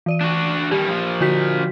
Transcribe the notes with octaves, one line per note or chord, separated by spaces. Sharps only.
E3 D5 D#7
D4 F#4
D#3 G3 G4
A#2 F3
D3 F#4 B6